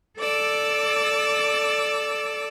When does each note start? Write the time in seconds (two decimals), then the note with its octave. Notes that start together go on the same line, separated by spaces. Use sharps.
0.18 A4 D5 D6 E6